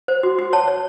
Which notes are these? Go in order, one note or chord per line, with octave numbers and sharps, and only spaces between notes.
C5
F#4
F#4
C#5 A5
C#5